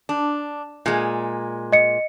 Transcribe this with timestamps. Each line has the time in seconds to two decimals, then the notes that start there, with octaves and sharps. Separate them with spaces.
0.09 D4
0.86 A#2 G#3
1.72 D#5 C#7